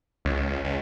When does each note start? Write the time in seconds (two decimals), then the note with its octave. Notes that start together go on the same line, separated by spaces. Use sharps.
0.25 C#2
0.64 C#2